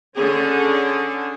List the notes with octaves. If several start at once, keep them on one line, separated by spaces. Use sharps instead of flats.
D3 C#4 G#4